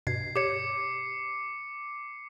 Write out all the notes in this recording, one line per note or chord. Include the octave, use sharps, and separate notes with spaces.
G2 B2 G#6 C7
G4 C#5 D6 C#7